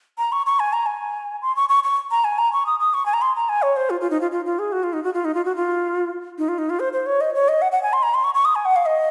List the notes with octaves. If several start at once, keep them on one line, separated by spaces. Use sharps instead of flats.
A#5
C#6
C#6
G#5
A#5
G#5
C6
C#6
C#6
C#6
A#5
G#5
A#5
C#6
D#6
D#6
C#6
G#5
A#5
C6
A#5
G#5
C#5
C5
F4
F4
D#4
F4
F4
F4
G#4
F#4
F4
D#4
F#4
F4
D#4
F4
F#4
F4
D#4
F4
D#4
F4
C5
C5
C#5
D#5
C#5
D#5
F#5
F#5
G#5
C6
A#5
C6
C#6
C#6
D#6
G#5
F#5
F5
D#5